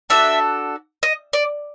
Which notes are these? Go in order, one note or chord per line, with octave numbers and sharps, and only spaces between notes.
D4 F#4 A4 E5
D#5
D5